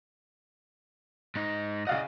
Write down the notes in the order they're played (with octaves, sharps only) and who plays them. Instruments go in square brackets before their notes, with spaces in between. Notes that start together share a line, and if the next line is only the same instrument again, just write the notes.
[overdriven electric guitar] G#2 D#4
[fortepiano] C#3 F5 F#5 [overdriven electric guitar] D5 D#5